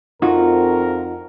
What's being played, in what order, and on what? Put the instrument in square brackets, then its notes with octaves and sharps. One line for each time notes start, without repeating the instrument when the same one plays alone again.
[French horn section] F2 [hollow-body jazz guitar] D#4 F4 F#4 [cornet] A#4